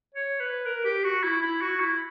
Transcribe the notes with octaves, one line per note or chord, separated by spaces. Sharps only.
C#5
B4
A#4
G4
F#4
E4
E4
F#4
E4